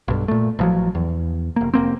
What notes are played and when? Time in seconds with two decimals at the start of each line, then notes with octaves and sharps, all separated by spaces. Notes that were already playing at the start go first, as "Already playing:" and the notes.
0.08 B1 G2
0.28 A#2 A3
0.59 A1 F3 F#3
0.95 E2
1.56 F1 A#3
1.74 F1 A#3 C4